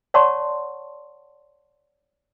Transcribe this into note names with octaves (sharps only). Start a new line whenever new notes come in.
C#5 D5 F#5 A5 C6 C#6